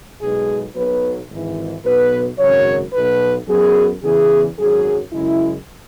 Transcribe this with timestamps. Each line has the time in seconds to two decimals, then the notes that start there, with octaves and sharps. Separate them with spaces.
0.20 B1 B2 G#3 G#4
0.75 B1 B2 F#3 B4
1.30 G#1 G#2 E3
1.84 B1 B2 B3 B4
2.39 G#1 F#2 C#3 F#3 C#5
2.94 B1 B2 B3 B4
3.48 F#2 F#3 B3 G#4
4.03 E2 C#3 E3 B3 G#4
4.58 G#1 F#2 F#3 G#4
5.12 F#2 C#3 G#3 E4